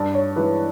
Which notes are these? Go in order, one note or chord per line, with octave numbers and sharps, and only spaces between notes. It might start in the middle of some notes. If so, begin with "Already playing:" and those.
Already playing: G2 D5
C#5
E3 G#3 B4